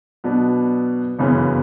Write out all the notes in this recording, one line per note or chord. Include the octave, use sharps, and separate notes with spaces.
B2 F#3 B3 D4
G1 F#2 C#3 E3 B3